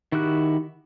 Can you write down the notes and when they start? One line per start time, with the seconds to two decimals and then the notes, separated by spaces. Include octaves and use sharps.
0.12 D#3 E4 F#4 G4 F#6